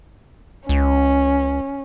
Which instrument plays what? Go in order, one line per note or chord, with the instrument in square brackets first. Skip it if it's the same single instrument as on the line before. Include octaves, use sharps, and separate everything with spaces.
[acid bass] C#2 [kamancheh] C#4